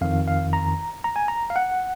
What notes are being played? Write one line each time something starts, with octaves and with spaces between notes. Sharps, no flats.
F2 D#3 F5
F5
A#5
A#5
G#5
A#5
F5
F#5